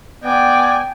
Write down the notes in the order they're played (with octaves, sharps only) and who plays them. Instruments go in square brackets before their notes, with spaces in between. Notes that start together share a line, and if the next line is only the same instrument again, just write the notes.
[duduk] B3 [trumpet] D5 [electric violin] G5 G#5